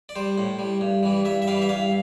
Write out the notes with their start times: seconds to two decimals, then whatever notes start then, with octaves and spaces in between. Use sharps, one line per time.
0.09 D5
0.16 G3 C5
0.38 A2
0.59 G3
0.81 G2
1.03 E3 G3
1.25 G2 E5
1.42 E5
1.47 E3 G3 F5
1.62 E5
1.69 G2 F5